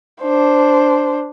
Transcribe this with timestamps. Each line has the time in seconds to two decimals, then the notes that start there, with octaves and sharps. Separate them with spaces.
0.22 D4 C5